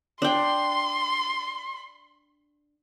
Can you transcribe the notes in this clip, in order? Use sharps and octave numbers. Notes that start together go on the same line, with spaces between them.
D4 G5 C6